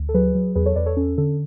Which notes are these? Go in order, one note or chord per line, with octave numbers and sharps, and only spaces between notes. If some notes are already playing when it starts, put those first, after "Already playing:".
Already playing: D2
A4
F#3 G#4 B4
F#3
E2 G#4 B4
A4 C#5
E2 B4 D5
A4 C#5
C#4 A4
D3 A4